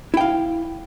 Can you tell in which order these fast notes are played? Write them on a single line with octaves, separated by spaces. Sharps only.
E4 G5 F5